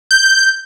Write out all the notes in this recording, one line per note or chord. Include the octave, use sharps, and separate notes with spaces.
G6